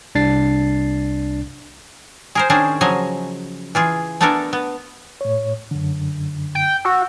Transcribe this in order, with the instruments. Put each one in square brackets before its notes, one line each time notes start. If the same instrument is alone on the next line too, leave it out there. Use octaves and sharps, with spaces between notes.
[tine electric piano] C2 D4 A6 C7
[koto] G#4 A#4 C5
D#3 C#4 D4 G#4 C5
C#3 F3 F#3 D#5 G#5
E3 F4 G#4
A3 B3 D4 A4 A#4 G#5
B3
[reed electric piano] A2 C#5
F#2 D3
[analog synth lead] G5
[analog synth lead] F#4 [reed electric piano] E6